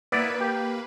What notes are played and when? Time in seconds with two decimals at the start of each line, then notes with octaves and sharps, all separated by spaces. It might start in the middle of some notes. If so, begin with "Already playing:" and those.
0.12 A#3 B3 E4 B4 D5
0.40 G4